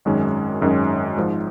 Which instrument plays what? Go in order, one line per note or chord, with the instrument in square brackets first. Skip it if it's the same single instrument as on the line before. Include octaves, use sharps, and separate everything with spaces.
[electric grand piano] G#1 F#2 D#3 G#3 C#4
G#1 F#2 D#3 G#3 C#4
G#1 G#2 F3